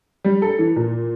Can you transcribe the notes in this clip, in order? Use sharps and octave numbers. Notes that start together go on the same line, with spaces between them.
G3
A4
E3
A#2